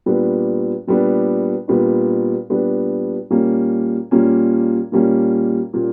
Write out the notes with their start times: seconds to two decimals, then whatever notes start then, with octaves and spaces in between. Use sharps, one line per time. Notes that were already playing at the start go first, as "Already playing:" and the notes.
0.06 A#2 G3 B3 D4
0.87 A#2 G3 B3 D4
1.68 A#2 G3 B3 D4
2.50 A#2 G3 B3 D4
3.30 A#2 G3 A#3 C#4
4.11 A#2 G3 A#3 C#4
4.92 A#2 G3 A#3 C#4
5.73 A#2 G3 A#3 C#4